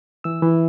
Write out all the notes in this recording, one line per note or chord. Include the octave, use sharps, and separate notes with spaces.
E3 E6
E3